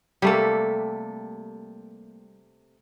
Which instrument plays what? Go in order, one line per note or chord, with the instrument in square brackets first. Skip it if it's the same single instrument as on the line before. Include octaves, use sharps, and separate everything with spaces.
[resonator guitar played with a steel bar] C3 A4 [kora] G3 A3 A#3